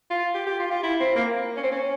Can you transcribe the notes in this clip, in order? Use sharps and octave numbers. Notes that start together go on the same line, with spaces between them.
F4
G4
G4
F4
F4
E4
C4
A#3
C#4
C4
C#4